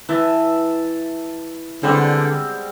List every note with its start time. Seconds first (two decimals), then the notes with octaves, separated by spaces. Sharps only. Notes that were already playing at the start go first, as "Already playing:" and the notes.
0.09 E3 B4 E5 A5
1.83 D3 G3 G#3 B3 C4 E5